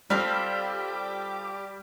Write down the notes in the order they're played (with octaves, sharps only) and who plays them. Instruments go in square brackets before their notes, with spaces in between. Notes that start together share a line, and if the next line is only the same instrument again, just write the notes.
[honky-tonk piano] G3 [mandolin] C4 F4 A4 [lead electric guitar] G4